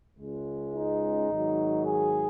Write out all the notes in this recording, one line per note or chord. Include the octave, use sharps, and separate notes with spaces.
C#2 C#3 G#3
D#4
G#1 G#2 D#3 F#3
G#4